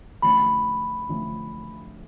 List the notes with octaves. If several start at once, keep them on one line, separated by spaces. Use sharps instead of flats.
D3 F3 A3 C#4 B5
D3 F3 A3 C#4